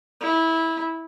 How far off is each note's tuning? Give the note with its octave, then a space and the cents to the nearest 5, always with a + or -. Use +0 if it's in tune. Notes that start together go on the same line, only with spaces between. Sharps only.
E4 -15